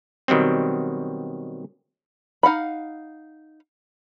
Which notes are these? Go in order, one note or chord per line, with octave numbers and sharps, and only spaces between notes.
B2 D#3 F#3 G3 C4
D#4 F5 F#5 B5